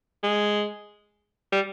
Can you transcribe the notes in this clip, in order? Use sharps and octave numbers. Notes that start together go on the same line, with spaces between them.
G#3
G3